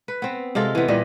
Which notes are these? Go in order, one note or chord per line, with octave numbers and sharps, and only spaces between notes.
B4
B3 C4
C3 G#3 F4 A4
E3 B3
A#2 E3 G3 D#5